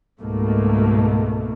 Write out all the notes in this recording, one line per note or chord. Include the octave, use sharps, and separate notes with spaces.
C#2 G#2 B2 A3 A#3